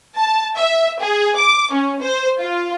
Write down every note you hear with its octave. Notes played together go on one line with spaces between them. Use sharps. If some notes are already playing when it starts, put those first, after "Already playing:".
A5
E5
G#4
D6
C#4
C5
F4